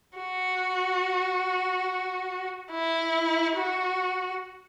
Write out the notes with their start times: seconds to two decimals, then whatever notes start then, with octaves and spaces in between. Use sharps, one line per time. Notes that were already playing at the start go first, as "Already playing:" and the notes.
0.18 F#4
2.71 E4
3.56 F#4